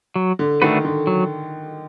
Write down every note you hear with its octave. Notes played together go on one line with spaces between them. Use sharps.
F#3
D3
D#3 A3 D4 F#4 B4
D3
F#3